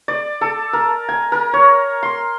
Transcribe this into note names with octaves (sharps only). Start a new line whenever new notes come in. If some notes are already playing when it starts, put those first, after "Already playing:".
D5
A4
A#4
G#5
A#4
C#5
C6